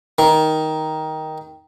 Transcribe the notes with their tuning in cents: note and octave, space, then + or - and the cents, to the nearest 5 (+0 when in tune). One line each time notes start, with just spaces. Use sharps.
D#3 +10